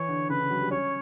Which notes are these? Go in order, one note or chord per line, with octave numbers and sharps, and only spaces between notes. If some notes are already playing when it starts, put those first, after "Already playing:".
Already playing: E3 C#5
D3
C#3 B4
D3
F#3
G3
C#4 C#5